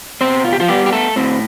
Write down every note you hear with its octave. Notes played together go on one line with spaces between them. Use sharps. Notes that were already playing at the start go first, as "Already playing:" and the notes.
B2 C4 C5
F4
G4
F3 F4
G3 B3 G4
G4
A3 A4
A2 C4